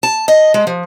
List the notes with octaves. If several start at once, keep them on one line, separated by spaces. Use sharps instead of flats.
A5
D#5
G#3
F3